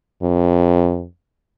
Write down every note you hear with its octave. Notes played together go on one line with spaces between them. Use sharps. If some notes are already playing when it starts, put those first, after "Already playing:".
F2